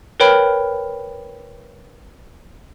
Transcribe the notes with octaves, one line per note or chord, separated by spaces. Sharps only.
A#4 B4 C#5 G5 B5 F6